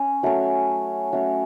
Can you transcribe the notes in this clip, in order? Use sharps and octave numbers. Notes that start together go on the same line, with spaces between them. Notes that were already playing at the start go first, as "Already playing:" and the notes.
Already playing: C#4
F#3 A3 C#4
F#3 A3 C#4